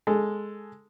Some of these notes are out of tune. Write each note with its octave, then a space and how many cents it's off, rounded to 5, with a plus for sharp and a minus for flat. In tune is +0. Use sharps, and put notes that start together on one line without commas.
G#3 +0 A4 +0